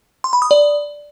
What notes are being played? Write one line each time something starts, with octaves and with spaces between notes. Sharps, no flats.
C6
B5
D#6
D5